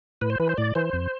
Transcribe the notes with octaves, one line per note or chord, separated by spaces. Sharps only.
A2 B4
C5
E3 B4
C5
A2 D5
E3 C5
F2